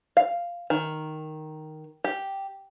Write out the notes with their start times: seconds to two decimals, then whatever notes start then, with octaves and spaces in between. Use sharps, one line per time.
0.17 F5
0.70 D#3
2.04 G4